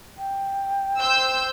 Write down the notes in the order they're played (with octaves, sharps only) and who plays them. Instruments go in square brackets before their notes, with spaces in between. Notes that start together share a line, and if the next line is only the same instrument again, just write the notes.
[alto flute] G5
[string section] C5 E6 G6